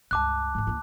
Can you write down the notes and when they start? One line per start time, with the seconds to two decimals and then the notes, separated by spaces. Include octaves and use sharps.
0.11 C#2 G2 A5 D6 F#6
0.55 G#2 D3
0.67 D2 A#3